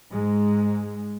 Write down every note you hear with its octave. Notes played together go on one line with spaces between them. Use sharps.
G#2 G#3